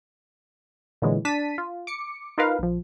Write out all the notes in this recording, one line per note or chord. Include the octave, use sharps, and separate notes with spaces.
A#2 D3 E3 F#3 G#3
D4 A5 B6 D#7
F4
D6 C#7
D#4 F4 A#4 B4 F5
A#1 F3